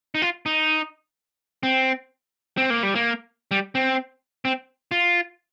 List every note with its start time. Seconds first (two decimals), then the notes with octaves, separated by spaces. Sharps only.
0.15 D#4
0.22 F4
0.46 D#4
1.63 C4
2.57 C4
2.70 A#3
2.83 G3
2.95 A#3
3.51 G3
3.75 C4
4.45 C4
4.91 F4